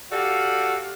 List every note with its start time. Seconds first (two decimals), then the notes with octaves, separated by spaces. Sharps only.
0.11 F#4 G4 A4 D5 F5 F#5